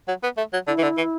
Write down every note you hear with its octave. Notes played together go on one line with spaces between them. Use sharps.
F#3
B3
A3
F#3
D3 E4
E3
D3
E3